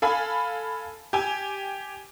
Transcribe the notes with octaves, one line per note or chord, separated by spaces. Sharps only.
A4 F5 G#5 B5
G4 G#5